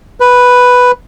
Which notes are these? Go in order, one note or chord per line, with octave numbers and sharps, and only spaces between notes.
B4